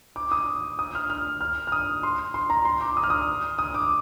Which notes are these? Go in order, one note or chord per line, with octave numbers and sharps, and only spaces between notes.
D6
D#6
D#6
F6
F6
F6
F6
D#6
C6
C6
A#5
C6
D6
D#6
F6
D#6
D#6
D6